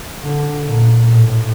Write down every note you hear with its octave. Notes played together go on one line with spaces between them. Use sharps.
D3
A#2
A2